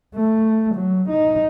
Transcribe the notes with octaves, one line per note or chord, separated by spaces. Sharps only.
A3
F#3
D#4